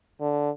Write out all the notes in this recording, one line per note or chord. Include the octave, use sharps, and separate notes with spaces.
D3